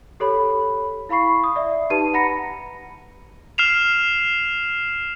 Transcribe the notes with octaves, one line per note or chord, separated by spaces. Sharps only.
G4 A4 C#5 B5
E4 F5 B5 C#6 C7
D#6
D5 E5
D#4 G4 B4 A5 D#7
F#5 A#5 B5 A#6 C#7
F6 C7 E7 F7